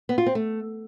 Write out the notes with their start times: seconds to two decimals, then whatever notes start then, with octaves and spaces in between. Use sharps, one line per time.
0.09 B3
0.18 F4
0.26 C4
0.35 A3